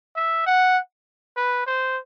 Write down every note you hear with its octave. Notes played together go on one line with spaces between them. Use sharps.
E5
F#5
B4
C5